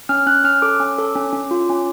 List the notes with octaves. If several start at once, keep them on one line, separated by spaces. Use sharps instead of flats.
C#4 F6
C#4 F#6
C#4 F6
A4 D6
C#4
A4
C#4
C#4
F4
C#4